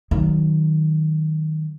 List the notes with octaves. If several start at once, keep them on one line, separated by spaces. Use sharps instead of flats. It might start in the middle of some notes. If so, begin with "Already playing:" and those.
D#3 F#3